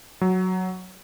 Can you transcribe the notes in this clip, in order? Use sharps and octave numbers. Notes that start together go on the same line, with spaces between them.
F#3